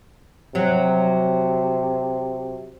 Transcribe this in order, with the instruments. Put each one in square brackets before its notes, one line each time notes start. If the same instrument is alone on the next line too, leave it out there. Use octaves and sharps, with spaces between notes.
[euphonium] C3 [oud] F#3